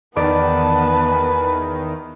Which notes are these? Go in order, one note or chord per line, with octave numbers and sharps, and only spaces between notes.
E2 D#3 B3 B4 D5 A5